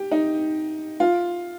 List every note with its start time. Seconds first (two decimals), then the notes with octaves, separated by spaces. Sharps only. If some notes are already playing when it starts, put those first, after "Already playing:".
Already playing: G4
0.11 D#4
1.00 F4